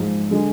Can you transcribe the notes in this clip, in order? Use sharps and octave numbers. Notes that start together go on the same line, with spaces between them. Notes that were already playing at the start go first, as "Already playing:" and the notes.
Already playing: G#2 F3 G#3
D3 G#3